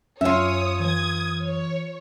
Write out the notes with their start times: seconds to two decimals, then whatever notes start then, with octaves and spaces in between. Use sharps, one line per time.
0.21 F#2 C#4 F4 C#5 E5 D#6
0.80 E3 D#6 G#6
1.45 C#5